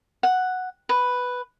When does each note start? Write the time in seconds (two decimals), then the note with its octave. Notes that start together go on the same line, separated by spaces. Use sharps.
0.23 F#5
0.89 B4